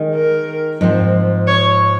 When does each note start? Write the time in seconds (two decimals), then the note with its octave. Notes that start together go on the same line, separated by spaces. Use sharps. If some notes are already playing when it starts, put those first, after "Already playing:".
Already playing: D#3 G#3
0.15 A#4
0.81 G#2 F3 C4
1.47 C#5